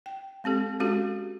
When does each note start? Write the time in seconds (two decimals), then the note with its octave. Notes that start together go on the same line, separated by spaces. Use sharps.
0.06 G5
0.44 G#3 C4 G4 A4
0.80 G#3 C#4 F#4 G4 A4